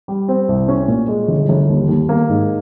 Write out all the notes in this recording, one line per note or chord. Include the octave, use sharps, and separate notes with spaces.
G3
C4
C2
C#4
A#2
G#3
G1
G1
D#2
D#2
A#3
G#2